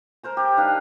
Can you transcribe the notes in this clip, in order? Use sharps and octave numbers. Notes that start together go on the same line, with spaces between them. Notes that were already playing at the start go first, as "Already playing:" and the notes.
A#4 C5 A#5
G4
D#3 D4 B4 F5